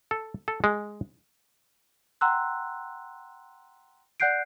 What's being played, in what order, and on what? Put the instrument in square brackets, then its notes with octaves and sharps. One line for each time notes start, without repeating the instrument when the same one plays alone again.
[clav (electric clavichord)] A4
A4
G#3
[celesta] F#5 G5 A#5 C6 E6 F#6
D5 F#5 F#6 G6 C7 D7